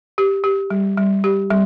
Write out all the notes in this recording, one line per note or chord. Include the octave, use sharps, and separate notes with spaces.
G4
G4
G3
G3
G4
G3